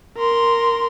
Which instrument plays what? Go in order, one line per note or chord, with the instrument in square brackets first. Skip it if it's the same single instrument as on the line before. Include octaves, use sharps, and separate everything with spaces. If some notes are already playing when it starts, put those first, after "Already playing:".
[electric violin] A#4 C6